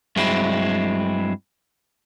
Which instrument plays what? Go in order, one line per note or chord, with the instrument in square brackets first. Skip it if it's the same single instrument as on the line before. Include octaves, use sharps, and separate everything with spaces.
[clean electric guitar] G2 F#3 G#3 C4 E4